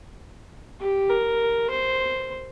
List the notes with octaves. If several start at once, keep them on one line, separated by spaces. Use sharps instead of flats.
G4
A#4
C5